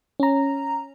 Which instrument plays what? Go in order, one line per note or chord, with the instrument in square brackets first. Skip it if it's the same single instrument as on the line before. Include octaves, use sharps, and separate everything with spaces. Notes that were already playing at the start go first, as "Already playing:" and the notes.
[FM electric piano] C#4 A#5